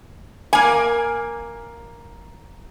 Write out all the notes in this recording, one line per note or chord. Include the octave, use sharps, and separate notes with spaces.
A#3 G#5